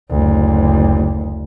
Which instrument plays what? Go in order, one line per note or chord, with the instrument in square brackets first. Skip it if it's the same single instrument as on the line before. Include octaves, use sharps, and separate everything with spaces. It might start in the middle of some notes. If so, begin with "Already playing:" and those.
[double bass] F#1 D2